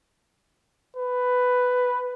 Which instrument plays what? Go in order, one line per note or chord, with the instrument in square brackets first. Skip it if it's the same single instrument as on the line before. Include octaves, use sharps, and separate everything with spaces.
[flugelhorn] B4